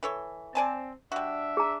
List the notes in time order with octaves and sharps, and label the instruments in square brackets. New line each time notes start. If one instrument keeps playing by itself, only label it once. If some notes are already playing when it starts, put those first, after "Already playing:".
[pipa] E3 A4 C#5
[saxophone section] C4 [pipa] D5 G#5 A5
[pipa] G3 F#4 [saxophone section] D4 E5
[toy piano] G#4 A#5